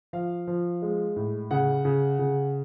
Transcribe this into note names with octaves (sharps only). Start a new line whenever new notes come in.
F3 F5
F3
G#3
A2
C#3 F#5
C#3
C#3